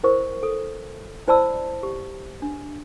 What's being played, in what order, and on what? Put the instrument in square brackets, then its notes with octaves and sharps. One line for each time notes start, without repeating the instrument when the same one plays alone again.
[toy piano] E4 A#4 C5 C#6
A4
E4 C5 D5 A5 B5 E6
G4
D4